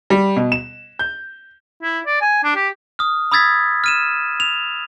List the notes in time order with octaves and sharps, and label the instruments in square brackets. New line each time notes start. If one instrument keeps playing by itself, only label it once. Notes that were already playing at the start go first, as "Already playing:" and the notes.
[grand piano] G3
B2
E7
G6
[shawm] E4
D5
G#5
D4
G4
[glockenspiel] D#6 F6
B5 D#6 E6 G#6 A6 B6
F6 D#7 E7
F7